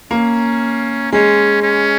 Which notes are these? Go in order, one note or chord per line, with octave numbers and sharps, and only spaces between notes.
A#3 C#4
G#3 C#4
C#4